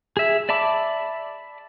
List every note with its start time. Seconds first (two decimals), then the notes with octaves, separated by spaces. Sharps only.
0.17 G#4 E5
0.49 D5 E5 A5 B5 D6